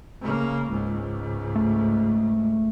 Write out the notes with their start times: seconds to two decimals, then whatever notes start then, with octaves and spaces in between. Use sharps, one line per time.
0.21 C#3 A#3
0.69 C#2 G#2
1.55 A3